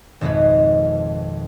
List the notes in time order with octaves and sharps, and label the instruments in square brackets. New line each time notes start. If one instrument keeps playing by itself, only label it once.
[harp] G#1 F2 B2 G#3 B4